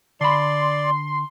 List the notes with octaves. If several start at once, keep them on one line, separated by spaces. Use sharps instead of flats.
D3 D5 B5 C6